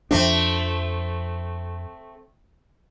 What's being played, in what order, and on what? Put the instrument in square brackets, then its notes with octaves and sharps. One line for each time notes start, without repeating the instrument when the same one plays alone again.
[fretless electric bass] F2 F3 D4 [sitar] A3 C4